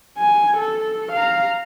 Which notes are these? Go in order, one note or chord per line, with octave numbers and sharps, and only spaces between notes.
G#5
A4
F5 A#5